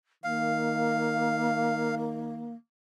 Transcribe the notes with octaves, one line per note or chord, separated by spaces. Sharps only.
D#3 A#3 F5